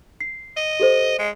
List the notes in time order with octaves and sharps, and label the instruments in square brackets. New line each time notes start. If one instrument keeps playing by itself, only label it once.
[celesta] C7
[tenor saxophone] D#5
[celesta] G4 A4 C5
[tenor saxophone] G#3